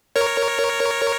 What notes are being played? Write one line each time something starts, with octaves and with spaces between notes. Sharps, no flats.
A#4 C#5